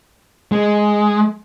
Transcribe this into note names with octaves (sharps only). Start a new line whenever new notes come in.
G#3